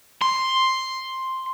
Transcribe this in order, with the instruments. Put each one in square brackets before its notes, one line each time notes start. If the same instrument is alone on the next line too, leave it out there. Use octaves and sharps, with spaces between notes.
[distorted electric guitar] C6